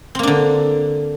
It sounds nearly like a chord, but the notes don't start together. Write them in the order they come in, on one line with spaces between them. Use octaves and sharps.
C4 A#3 D4 D3